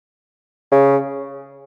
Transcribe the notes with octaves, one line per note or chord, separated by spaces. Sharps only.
C#3